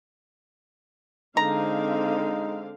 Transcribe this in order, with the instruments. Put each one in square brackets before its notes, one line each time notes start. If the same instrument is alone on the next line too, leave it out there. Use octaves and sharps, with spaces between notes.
[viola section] D3 C4 F5 [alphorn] G#3 [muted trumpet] D#4 [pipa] A#5